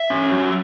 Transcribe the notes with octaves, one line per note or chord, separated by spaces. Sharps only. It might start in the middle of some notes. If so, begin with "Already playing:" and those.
Already playing: E5
C#4
F#3